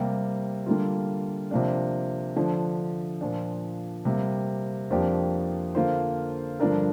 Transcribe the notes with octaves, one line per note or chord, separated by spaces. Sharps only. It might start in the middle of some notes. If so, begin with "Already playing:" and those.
Already playing: C3 G3 A#3
D3 G3 A#3 F4
C3 F3 A#3 D4
D3 F3 D4
A#2 F3 D4
C3 G3 A#3
F2 F3 A#3 D4 G4
D3 A#3 F4 C5
G2 D3 F3 D4 A#4